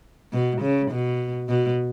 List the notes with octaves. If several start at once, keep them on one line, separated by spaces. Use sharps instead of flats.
B2
C#3
B2
B2